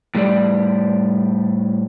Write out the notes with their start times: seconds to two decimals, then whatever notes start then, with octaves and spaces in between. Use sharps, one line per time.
0.15 A2 G3 G4 D5